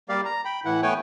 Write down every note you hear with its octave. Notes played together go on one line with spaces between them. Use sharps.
G3 A#3 G4 D5 F5
A#5
G5 B5
A2 E3 E4 F#5
A3 B3 B4 C#5 G5 G#5